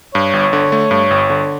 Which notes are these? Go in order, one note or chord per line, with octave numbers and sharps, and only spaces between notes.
G2 C#5
G1
D3
A3
G2
G1
D3